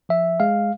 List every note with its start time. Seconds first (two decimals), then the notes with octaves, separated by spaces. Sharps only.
0.09 F3 E5
0.40 G#3 F5